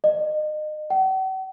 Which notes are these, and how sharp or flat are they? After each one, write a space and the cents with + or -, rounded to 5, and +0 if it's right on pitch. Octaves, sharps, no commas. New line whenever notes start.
D#5 -30
F#5 +45